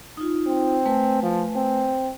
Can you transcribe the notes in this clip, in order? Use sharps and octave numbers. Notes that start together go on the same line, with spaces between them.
D#4 F4
C4
A3 B4 G#5
F3
C4